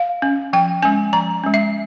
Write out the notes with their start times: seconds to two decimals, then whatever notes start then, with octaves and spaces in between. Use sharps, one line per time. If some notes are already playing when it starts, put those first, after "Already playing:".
Already playing: F5
0.22 C#4
0.53 F3 G5
0.82 G#3 C#4 G#5
1.13 F3 A#5
1.44 G#3 C#4
1.54 E5